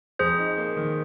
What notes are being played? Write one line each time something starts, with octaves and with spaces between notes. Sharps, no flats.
F2 G#4 C5
D#4
A#3
D#3